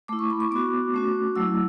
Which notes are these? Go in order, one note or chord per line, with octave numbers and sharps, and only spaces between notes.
A3 E4 D6
C#6
B5
C#6
B3 F#4 D6
A3 C#4 F#4
F#3 A3 E4 E6